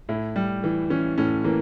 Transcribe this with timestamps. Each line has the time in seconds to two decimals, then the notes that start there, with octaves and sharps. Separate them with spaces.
0.09 A2 E4
0.36 G3
0.64 E3
0.90 E3 C#4
1.18 A2 C#4
1.44 E3 A#3